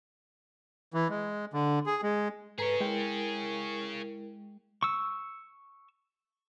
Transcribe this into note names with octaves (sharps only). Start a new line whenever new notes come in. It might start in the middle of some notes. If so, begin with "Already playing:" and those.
E3
G#3
D3
G#4
G#3
G#2 G#4 A4 B4 C#5 A#5
G#3 E4 A#4 G5
C#6 E6